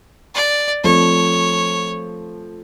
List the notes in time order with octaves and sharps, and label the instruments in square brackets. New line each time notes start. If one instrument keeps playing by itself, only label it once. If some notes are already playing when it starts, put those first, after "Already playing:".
[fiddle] D5
[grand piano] F3 A3 C4 [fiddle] C#5